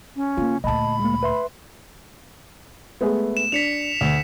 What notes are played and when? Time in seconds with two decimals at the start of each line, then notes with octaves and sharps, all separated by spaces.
0.16 C#4
0.37 C#3 A#3 F4
0.64 D2 A#2 D#5 A5 B5
1.00 G#3 A#3
1.23 B4 E5 C6
3.01 G#3 A3 B3
3.37 E7
3.52 D4 B6 C#7 F7
4.01 D2